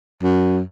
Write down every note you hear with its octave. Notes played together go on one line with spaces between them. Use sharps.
F#2